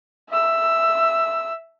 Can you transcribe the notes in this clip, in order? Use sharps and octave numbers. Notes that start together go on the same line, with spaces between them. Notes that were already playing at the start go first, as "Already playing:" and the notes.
E5 E6